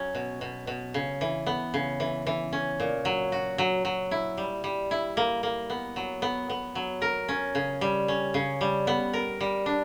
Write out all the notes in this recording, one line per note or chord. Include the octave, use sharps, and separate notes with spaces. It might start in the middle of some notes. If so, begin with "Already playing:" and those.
Already playing: F#3 C#4
B2
B2
B2
C#3
E3
B3
C#3
E3
E3
C#4
A#2
F#3
F#4
F#3
F#3
E4
G3
G3
E4
A#3
A#3
B3
F#3
B3
B3
F#3
A#4
C#4
C#3
G3
C#4
C#3
G3
B3
A#4
G3
D4